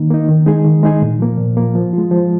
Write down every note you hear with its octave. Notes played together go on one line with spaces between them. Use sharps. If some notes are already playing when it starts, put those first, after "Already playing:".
Already playing: D#3 A#3 D#4
A#3 D#4
D#3
G#3 D#4 G#4
D#3
G#3 D#4 G#4
A#2
F3 A#3
A#2
F3 A#3
F3
G#3 F4
F3